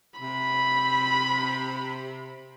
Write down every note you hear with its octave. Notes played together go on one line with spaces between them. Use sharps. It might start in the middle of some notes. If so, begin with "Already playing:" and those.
C3 B5